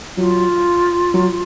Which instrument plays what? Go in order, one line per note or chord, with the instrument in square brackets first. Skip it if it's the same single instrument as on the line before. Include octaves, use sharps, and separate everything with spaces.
[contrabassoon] F#3 [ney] F4
[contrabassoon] F#3